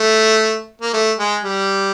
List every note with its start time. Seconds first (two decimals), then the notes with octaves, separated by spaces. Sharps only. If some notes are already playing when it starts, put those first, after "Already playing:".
Already playing: A3
0.82 A#3
0.94 A3
1.18 G#3
1.44 G3